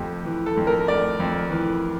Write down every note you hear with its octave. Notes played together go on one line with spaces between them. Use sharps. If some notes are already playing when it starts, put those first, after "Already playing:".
Already playing: F2 A3 G4
E3
A4
F2
A#4
A3 D5
F2
E3